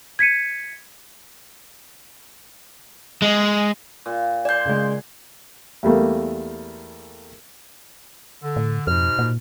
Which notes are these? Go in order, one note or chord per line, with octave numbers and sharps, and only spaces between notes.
G#6 B6 C#7 D#7
G#3
A#2
D5 G#5 C6 G6
C#3 G#3
E2 G3 A3 A#3
D3
A2
F2 G#2 B2 F6
A#2